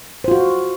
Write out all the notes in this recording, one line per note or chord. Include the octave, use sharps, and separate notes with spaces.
F4 F#4 C5